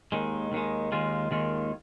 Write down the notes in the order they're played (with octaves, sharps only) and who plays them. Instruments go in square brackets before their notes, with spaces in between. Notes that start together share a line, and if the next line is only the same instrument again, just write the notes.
[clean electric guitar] D#2 D#3 G#3
D#2 D#3 G#3
D#2 D#3 G#3 F4
D#2 D#3 G#3 F4